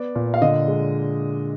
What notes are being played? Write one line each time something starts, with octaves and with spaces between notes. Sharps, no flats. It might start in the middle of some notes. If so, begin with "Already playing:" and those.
Already playing: B3 D5
A#2
F5
D3 D#5
G#3